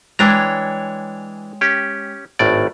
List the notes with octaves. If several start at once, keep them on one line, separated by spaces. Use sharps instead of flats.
E3 G#3 D4 C#5 G5 A#5
C#4 G4
G#1 A2 D5